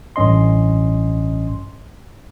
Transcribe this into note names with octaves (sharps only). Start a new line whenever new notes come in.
A1 G2 C#4 D#5 C6